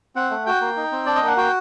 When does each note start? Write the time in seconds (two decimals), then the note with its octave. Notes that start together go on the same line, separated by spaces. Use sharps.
0.16 C4 F#5
0.31 A3
0.46 F#4 G5
0.61 A#3
0.77 D#4
0.92 C4
1.06 D4 D5
1.16 D#5
1.22 A#3 F#5
1.37 F#4 G5